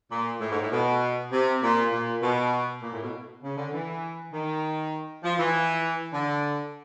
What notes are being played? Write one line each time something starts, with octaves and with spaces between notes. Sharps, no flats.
A#2
A2
G#2
A2
B2
C3
A#2
A#2
B2
A#2
A2
B2
C#3
D3
E3
D#3
F3
E3
D3